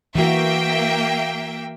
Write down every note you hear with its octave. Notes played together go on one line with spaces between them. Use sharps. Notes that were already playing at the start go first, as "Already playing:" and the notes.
E3 A#3 F#4 E5 G5